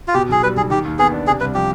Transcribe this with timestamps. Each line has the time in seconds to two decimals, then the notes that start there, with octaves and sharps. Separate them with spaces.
0.08 F4
0.14 B2 G4
0.29 B1 G#4
0.42 G3 B4
0.56 B1 G#4
0.70 D#3 G4
0.85 D#2
0.99 B3 G#4
1.12 D4
1.26 C3 G#4
1.40 C2 B4
1.54 F3 G4